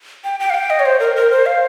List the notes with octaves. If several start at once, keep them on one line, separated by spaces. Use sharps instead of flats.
G5
G5
F5
G5
D#5
C#5
C5
A#4
A#4
C5
F5